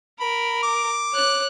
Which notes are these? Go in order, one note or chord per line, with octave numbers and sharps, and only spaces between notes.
A#4 B5
D6
C#5 F#6